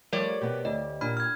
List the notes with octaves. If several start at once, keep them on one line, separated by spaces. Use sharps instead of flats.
F3 G3 A3 A#4 C#5 D5
B2 B3 G4
D2 D#5
A#2 D4 B5 F6
F6 G#6